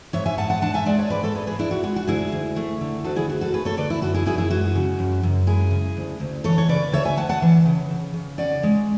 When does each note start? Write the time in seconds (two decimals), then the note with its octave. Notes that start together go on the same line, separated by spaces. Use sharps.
0.13 G#2 C#5 E5
0.26 E5 G#5
0.38 G#2 F#5 A5
0.50 F#5 A5
0.62 D4 F#5 A5
0.74 E5 G#5
0.86 G#3 D5 F#5
0.99 C#5 E5
1.10 G#2 B4 D5
1.23 A4 C#5
1.35 G#2 G#4 B4
1.47 G#4 B4
1.59 D4 E4
1.71 F#4
1.83 G#3 F#4
1.96 F#4
2.07 D2 E4 G#4
2.32 D2
2.56 A3
2.81 D3
3.04 D2 F#4 A4
3.16 E4 G#4
3.29 D2 F#4
3.41 F#4 A4
3.54 A3 G#4 B4
3.65 A4 C#5
3.78 D3 B4 D5
3.90 E4
4.01 F#2 F#4
4.14 E4 G#4
4.26 F#2 E4 G#4
4.38 E4 G#4
4.50 G#3 F#4
4.75 C#3
4.99 F#2
5.23 F#2
5.47 G#3 E4 G#4
5.71 C#3
5.97 D2
6.20 D2
6.44 E3 A4 C#5
6.58 C#5
6.69 C#3 B4 D5
6.92 D2 C#5 E5
7.05 E5 G#5
7.17 D2 F#5 A5
7.29 F#5 A5
7.42 E3
7.65 C#3
7.91 C#3
8.14 C#3
8.38 C#4 D5 F#5
8.63 G#3